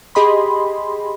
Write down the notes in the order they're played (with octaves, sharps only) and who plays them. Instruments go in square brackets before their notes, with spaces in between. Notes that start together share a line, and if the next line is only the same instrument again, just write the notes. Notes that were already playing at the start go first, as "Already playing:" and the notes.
[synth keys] G4 G#4 D#5 B5 C6